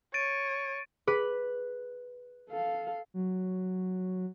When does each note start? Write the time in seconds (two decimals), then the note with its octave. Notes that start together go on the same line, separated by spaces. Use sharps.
0.14 C#5 A6 D7 D#7
1.07 G#4 B4
2.49 A4 F5
3.14 F#3